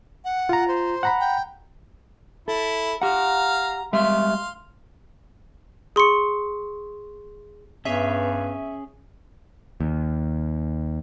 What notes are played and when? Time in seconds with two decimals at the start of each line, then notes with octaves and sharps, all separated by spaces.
0.24 F#5
0.49 F4 A#5
0.68 C5
1.03 F#5 A#5 B5
1.20 G5
2.48 E4 A4
3.02 G4 F5 F#5 A#5
3.93 G3 G#3 E5 F5 C6
5.96 G#4 C6 C#6 C#7
7.85 G2 B3 C#4 G#4 C#5 E5
9.81 D#2